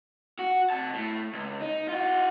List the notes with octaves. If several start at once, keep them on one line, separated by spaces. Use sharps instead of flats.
F#4
C3 A5
A2
C#2
D#4
F4 F#4